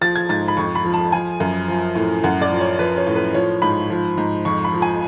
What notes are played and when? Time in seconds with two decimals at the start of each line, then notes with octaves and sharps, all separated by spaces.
0.01 F3 A6
0.16 G#6
0.29 G#2 A6
0.48 B5
0.57 F2 C#6
0.75 B5
0.85 F3
0.94 A5
1.12 F3 G#5
1.40 F#2
1.68 F3
1.95 A2
2.23 F#2 F#5
2.42 D5
2.51 F3
2.60 C#5
2.79 F3 B4
2.97 C#5
3.07 A2
3.16 B4
3.34 F3 C#5
3.62 G#2 B5
3.90 F3
4.18 G#2
4.45 F2 C#6
4.65 B5
4.73 F3
4.82 G#5